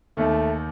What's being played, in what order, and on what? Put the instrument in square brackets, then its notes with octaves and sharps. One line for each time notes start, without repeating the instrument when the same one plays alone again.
[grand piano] D#2 D#3 [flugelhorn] A3